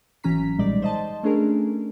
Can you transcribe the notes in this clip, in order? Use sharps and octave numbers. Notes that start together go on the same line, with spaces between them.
G#1 E3 F#3 C#4 A#5 B6
B1 A#2 G3 G#3 D#4 D5
C5 D#5 A5
A3 C#4 D4 G#4 A#4